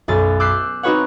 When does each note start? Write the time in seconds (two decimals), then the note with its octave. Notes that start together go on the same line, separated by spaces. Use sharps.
0.08 B1 F#2 A6
0.40 D6 E6 F#6 G6 B6 C7
0.83 C4 D#4 F#4 B4 C#5 F#5